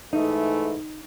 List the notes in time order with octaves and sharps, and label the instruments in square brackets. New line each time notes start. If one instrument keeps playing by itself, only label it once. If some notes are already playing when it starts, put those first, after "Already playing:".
[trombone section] G#2 E3 A3 [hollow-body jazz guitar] D#4